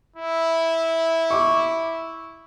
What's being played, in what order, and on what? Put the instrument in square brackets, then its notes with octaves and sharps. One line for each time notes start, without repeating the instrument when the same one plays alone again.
[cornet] E4
[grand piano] C#6 D6